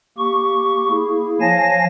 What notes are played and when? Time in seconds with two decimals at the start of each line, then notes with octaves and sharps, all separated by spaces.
0.18 A#3 G4 C#6
0.91 A#3 E4 G#4
1.41 F3 C#5 F5 G#5 A5 A#6